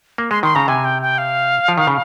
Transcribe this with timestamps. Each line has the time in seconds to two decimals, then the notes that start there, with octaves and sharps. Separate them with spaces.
0.18 A#3
0.31 G#3 C6
0.43 D#3 C6
0.55 C#3 A#5
0.68 C3 G#5
0.85 G5
1.02 G5
1.18 F5
1.68 F3
1.78 D#3
1.87 C#3